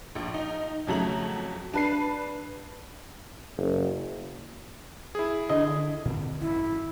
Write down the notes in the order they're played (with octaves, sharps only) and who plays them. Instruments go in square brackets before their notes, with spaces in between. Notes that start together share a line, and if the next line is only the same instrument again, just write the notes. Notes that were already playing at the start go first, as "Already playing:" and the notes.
[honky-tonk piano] A#1
D#4
F2 C#3 F#3 A3 A#5 F#7
D4 B4 C7
[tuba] F#1
[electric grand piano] E4 G#4
[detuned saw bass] D3 [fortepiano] D#5
[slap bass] A#2 D3 C4
[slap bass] G#1 F#2 [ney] E4